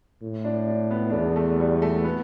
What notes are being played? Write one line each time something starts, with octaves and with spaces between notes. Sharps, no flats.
A2
D4
D4
B3
D4
E2 B3
A3
G3
A3
B3